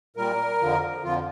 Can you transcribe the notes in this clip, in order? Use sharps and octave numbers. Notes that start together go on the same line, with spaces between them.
A#2 G3 A#4
F2 D3 F3
F2 D3 F3 F4